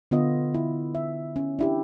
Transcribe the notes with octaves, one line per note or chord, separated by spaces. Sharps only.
D3 B3 F4 D#5
E4
E5
C#4
D4 E4 G4